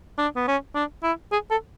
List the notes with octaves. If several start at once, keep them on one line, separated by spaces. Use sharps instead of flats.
D4
B3
C#4
D4
E4
G#4
A4